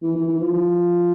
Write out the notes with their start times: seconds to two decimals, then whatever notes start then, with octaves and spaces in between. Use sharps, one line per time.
0.03 E3
0.16 E3
0.28 E3
0.41 F3
0.54 F3